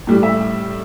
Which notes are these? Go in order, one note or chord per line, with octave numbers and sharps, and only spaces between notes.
A2 G3
E5